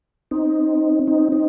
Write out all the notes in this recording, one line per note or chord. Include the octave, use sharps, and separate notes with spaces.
C4 D#4
C4 D#4
C4 D#4